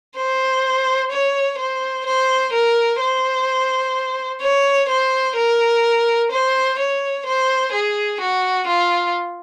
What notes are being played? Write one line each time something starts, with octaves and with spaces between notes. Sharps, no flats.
C5
C#5
C5
C5
A#4
C5
C#5
C5
A#4
C5
C#5
C5
G#4
F#4
F4